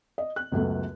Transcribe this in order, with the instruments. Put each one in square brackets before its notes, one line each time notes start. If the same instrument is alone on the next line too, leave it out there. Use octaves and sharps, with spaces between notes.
[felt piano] D#5
F#6
C#2 F#2 A3 B3